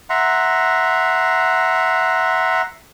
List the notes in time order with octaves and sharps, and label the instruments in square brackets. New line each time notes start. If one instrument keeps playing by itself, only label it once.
[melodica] E5 F#5 A#5 C6